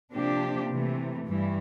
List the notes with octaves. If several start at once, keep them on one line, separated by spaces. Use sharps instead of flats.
C3 F3 A#3 D4 G4
C3 E3 A3
G2 E3 G3